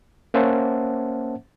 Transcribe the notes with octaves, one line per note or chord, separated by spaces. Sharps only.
A#3 C#4 C5 E5 F#5 A5